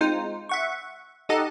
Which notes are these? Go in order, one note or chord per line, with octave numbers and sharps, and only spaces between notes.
G#3 C4 D#4 F4 C5
E5 F#5 C#6
D#4 G4 A4 D#5 F#5 A5